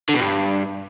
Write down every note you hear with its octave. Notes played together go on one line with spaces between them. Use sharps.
D3
B2
G2